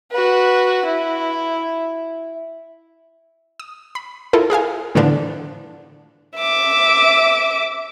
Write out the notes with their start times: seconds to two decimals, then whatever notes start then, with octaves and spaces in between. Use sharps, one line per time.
0.12 F#4 B4
0.85 E4
3.60 D#6
3.95 B5
4.33 E4 F4 A4 A#4
4.50 G#4 A#4 F5 G#5
4.95 A2 D3 E3 F3 B3 D4
6.37 E5 D6